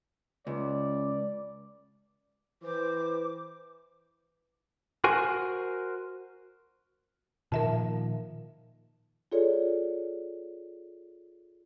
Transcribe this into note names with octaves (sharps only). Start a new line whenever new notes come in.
C#2 D5
E3 C5 D6
F#4 A#4 C5 G#5
A#2 D#3 F3 A#4 E5 A5
F4 G#4 A4 C#5 D5